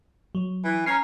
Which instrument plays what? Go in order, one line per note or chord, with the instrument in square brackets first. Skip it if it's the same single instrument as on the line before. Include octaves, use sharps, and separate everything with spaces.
[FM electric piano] F#3
[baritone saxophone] E3
[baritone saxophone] C#4 [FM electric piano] A#5 F6 C7